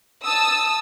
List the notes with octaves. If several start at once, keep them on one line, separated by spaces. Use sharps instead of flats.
A5 D#6 E6